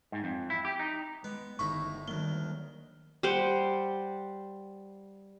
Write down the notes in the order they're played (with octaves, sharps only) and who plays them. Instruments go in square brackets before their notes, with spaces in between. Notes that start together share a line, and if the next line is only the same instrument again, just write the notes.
[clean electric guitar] G#2
F2
E4
G4
D#4
[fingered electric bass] G#3 [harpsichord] B3
[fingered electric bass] G1 D3 D#3 [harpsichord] A2 D#4 E4 [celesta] C#6
[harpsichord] D2 D#3 [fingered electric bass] F#3 G3 A#3 [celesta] G7
[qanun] G3 C5 F#5